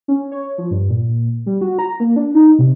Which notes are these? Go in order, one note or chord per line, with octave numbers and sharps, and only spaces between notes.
C#4
C#5
F3
G2
A#2
G3
F#4
A#5
A#3
D4
D#4
C3